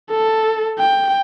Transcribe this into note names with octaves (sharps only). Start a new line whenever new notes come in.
A4
G5